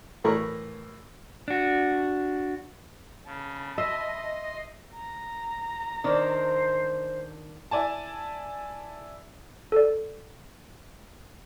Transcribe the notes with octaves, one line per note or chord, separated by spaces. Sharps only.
A2 E3 A#4 B5 C#6
D4 F#4
C#3 A5 B5
D#5 E5 C6
A#5
D#3 D4 C5
E4 D5 G#5 A5
A4 D5